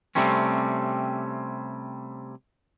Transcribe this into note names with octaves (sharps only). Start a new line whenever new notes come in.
C3 G3 A3 C4 C#4